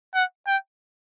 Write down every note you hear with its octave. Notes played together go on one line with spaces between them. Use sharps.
F#5
G5